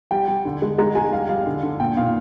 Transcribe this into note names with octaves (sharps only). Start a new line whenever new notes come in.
G3 G5
G3
D3
G#3
G#3 A#5
G#3 G#5
G3 F5
G3 F5
D3
D3
A#2 G5
A#2 F5